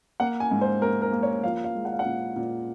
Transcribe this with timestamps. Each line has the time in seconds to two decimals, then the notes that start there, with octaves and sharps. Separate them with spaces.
0.20 A#3 F#5
0.40 G#5
0.51 G#2
0.61 C5
0.81 A#3 A#4
1.02 A#4
1.12 A#3
1.23 C#5
1.43 F3 F5
1.64 F5
1.75 G#3
1.85 F#5
1.92 F5
1.99 F#5
2.05 A#2
2.36 A#2